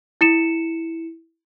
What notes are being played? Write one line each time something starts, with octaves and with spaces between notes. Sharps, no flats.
E4 C#7 E7